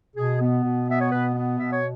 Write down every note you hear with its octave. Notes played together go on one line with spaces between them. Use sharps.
B2 G#4
B3
B2
B3 E5
C#5
B2 B4
B3
B2 E5
C#5